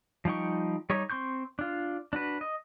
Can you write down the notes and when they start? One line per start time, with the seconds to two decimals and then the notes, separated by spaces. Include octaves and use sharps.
0.25 F3 G3 D#4 G5 C#6
0.90 G3 D#4 G4 C#5 C#6
1.10 C4 C6 C#6 G6
1.59 D4 F4
2.13 D4 F#4 B4
2.41 D#5